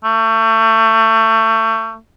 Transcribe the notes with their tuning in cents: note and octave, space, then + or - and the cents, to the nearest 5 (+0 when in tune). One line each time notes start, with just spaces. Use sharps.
A3 +30